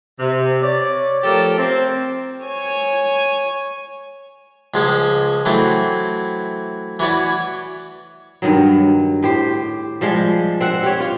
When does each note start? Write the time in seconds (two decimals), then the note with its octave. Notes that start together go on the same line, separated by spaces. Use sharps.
0.20 C3
0.62 C#5 D5
1.24 F3 A3 G4 A4 A#4
1.59 C4
2.45 C#5 G#5
4.74 C#2 F3 G#3 C#4
5.45 E3 F#3 A3 C4
6.99 E3 F#4 B4 C#5 D5
8.42 G2 D#3 F#3
9.23 A2 G4 C5
10.01 F3 G3 G#3
10.60 C4 E5 F#5
10.83 G4 C#5
11.00 F4